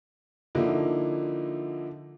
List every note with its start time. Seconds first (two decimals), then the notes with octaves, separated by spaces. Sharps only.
0.55 D3 F3 A#3 D#4 E4